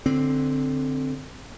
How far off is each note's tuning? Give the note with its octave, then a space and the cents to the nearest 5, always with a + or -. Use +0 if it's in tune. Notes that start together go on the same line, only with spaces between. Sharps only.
D3 +0 C4 +0